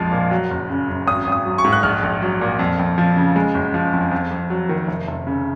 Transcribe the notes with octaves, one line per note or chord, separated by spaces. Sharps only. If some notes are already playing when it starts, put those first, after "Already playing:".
Already playing: A#1 F2 F3 G#3 F5
A#2
F#3
F#1
C#3
F#2
G#1 D#6
G#1
D#6
F#3
C#6
G#2
F#6
A#1 F6
A#1
F#3
A#2
F2
F2
F3
C#3
G#3
F#1
F3
F2
F2
F2
F#3
D#3
F1
F1
C#3